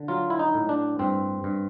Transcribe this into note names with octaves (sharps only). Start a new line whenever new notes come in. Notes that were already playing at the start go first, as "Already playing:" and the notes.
Already playing: D3
F#3 F4
E4
D#4
A2
D4
G2 C4
G2